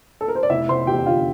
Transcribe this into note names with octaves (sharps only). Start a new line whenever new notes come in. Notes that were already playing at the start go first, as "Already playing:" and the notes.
A4
A#4
C5
D5
F1 E4 E5
F1 C5 C6
E2 G4 G5
D3 F4 F5